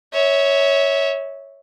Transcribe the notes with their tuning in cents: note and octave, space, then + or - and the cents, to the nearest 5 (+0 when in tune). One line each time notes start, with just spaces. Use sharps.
C#5 +0 E5 -25